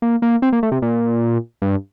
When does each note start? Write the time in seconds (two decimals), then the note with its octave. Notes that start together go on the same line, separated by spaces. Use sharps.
0.02 A#3
0.22 A#3
0.42 C4
0.52 A#3
0.63 A3
0.72 C3
0.82 A#2
1.62 G2